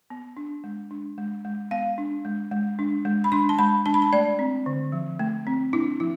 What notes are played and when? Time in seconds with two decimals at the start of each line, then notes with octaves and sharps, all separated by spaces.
0.10 B3
0.37 D4
0.64 G#3
0.91 D4
1.18 G#3
1.45 G#3
1.71 B3 F5
1.98 D4
2.25 G#3
2.52 G#3
2.79 D4
3.05 G#3
3.24 B5
3.32 D4 C6
3.49 A5
3.59 G#3 B5
3.86 D4 A5
3.94 B5
4.02 A5
4.13 A3 D5
4.39 C4
4.66 D3
4.92 F3
5.19 A3
5.47 C4
5.73 D4 E4
6.00 F3 E4